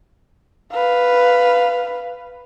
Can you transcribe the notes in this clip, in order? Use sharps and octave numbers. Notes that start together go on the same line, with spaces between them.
B4 F5